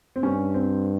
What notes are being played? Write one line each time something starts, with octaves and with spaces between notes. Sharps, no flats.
C4
G2 C#4
C4